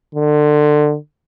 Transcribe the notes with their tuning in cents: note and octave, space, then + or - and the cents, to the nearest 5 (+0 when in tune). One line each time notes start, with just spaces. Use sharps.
D3 +25